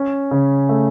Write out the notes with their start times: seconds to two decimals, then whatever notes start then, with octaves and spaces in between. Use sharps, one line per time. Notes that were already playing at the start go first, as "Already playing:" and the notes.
Already playing: C#4
0.31 C#3
0.69 A3